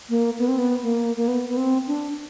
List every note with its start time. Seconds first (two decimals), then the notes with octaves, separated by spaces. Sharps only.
0.10 A#3
0.39 B3
0.48 C4
0.58 B3
0.83 A#3
1.17 A#3
1.28 B3
1.49 B3
1.57 C4
1.87 D4